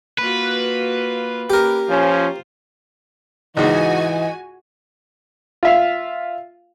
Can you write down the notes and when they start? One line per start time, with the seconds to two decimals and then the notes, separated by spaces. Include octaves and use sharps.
0.18 A#3 F4 F#4 B4
1.50 A#3 C#4 G4 A#4
1.89 F3 C#4 F4 C5
3.57 C#2 G#2 E3 F#4 D#5 G#5
5.63 F4 E5 F5